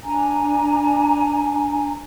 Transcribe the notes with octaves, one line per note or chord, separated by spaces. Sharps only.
D4 G#5 A#5